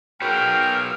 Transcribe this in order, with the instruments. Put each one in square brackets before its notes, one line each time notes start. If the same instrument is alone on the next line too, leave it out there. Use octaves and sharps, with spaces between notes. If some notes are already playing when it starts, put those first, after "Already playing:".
[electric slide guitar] F#4 B4 C#5 [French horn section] G#4 A#4 [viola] F5 [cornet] G5